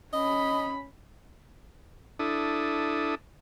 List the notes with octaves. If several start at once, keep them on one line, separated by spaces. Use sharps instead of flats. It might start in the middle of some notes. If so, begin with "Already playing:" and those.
C#4 D#5 B5
D4 E4 A4 D#6